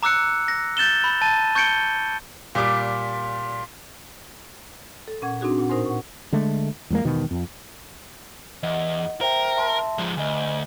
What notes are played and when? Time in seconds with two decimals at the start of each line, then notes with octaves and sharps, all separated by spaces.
0.03 A#5 D6 E6 F#6 C#7
0.48 A#6
0.77 G6 A6 E7 G7
1.04 B5
1.21 A5 A6 D#7
1.55 C#6 G6 G#6 C#7 D7 G7
2.55 A#2 G3 D6
5.08 A4
5.22 A#2 C#4 F#5 G#6
5.41 C4 D4 D#4 F#4 G#4
5.58 A#2 F#5
5.69 A2 D#4 A#4 C5 G#5 C6
5.85 F#5 C#6
6.32 D3 G#3 A3
6.90 E2 G#3 A#3
7.04 E1 B2 D#3
7.31 F2
8.63 E2 D#5 F#5
9.21 A#4 C5 E5 G5
9.57 E5 A5 C6
9.98 F3 G#3
10.17 D2 D#5 G#5